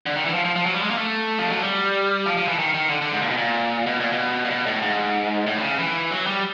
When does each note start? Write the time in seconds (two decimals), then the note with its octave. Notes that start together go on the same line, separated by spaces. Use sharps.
0.06 D3
0.15 D#3
0.25 E3
0.34 F3
0.45 F3
0.56 F3
0.66 F#3
0.74 G3
0.82 G#3
0.90 A#3
0.98 A3
1.38 F3
1.50 F#3
1.62 G3
2.26 F3
2.37 F3
2.48 E3
2.59 D#3
2.74 D#3
2.90 D3
3.01 D3
3.11 G#2
3.22 A#2
3.30 B2
3.37 A#2
3.86 B2
4.00 A#2
4.12 B2
4.45 A#2
4.50 B2
4.66 A2
4.82 G#2
5.47 A2
5.58 D3
5.62 C#3
5.79 E3
6.10 F#3
6.27 G3